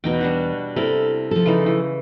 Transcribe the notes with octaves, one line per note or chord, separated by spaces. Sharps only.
E2 B2 D#4 G5
G3 D4 F#4
C3 E4 A4 A#4
F3 A4
C#3 E3 D#4
E3